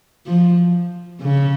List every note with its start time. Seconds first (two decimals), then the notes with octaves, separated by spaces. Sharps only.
0.26 F3
1.22 C#3